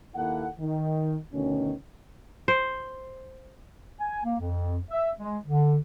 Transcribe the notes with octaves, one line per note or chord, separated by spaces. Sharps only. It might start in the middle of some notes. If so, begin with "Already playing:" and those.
D#2 A#3 E4 A4 F#5
D#3
D2 B2 D#3 C#4
C5
G#5
A#3
F2
E5
G#3
D3